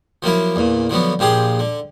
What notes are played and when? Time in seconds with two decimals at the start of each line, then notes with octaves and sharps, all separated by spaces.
0.22 F3 F#3 A#3 E4
0.56 E2 A#2
0.90 D3 F3 F#3 B3
1.19 A#1 F3 G4 G#4 C6
1.59 D3